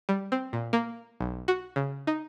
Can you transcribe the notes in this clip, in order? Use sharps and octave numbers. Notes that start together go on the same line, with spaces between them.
G3
C4
A#2
A#3
B1
F#4
C#3
D#4